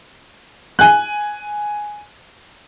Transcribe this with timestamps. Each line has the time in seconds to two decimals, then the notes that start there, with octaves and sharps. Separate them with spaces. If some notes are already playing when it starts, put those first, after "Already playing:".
0.79 G#5 F#6